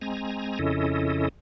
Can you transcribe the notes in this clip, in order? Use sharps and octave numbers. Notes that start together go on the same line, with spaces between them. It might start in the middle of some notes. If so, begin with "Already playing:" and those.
G#3 C4 G#5 A#5
F2 C#3 C#4 E4 A4 D#5